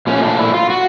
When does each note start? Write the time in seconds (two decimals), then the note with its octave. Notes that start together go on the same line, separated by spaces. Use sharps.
0.07 A#2 F3 A3 C#4
0.23 D4
0.38 E4
0.54 F4
0.70 F#4